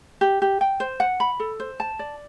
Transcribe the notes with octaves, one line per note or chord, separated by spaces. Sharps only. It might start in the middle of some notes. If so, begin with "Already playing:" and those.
G4
G4
G5
C5
F#5
B5
A4
C5
A5
D5